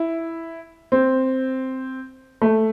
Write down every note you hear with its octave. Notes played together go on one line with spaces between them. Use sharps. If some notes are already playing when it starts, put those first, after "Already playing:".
Already playing: E4
C4
A3